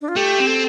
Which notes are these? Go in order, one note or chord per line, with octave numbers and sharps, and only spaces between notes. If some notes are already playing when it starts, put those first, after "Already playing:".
D4
F4
A3 G4
C4
A4